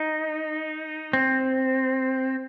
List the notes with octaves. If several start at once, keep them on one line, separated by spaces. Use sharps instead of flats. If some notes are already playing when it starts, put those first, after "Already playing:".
Already playing: D#4
C4